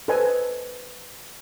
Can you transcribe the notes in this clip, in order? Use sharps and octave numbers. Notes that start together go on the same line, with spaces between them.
A4 B4 C5 D#5 G#5